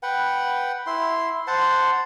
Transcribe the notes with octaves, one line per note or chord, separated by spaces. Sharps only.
B4 F#5 G5
E4 C6
C5 F#5 A5